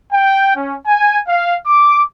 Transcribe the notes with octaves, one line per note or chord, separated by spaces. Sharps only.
G5
C#4
G#5
F5
D6